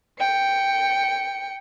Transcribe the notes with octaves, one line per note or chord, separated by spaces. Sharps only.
G5 C#7